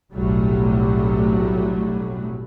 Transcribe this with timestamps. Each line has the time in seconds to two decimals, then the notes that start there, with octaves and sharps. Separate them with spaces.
0.12 F1 B1 A2 F#3 G3 A3